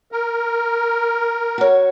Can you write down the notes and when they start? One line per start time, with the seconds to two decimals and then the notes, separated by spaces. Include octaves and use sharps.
0.12 A#4
1.58 F#4 C#5